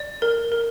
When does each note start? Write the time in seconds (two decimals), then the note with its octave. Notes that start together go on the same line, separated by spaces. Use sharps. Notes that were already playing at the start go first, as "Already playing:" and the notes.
Already playing: D5
0.22 A#4
0.52 A#4